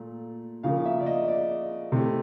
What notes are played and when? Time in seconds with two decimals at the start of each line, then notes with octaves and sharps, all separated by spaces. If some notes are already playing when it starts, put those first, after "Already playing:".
Already playing: A#2 A3
0.63 C#3 F3 A#3 F5
0.85 E5
1.00 D5
1.06 D#5
1.28 D5
1.92 C3 E3 A3